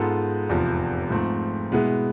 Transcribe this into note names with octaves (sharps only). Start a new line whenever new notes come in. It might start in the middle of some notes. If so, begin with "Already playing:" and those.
Already playing: G#2 G#3 B3 F4 A4
F1 E2 C3 F3
G#2 F3 A3 C4
B2 G#3 B3 E4